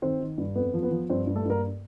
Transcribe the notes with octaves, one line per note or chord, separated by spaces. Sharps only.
D#3 C4 C5
D#3
G2
F2 B3 B4
F3
B3 B4
F3
G2 C4 C5
G2
A3 A4
G2 A#3 A#4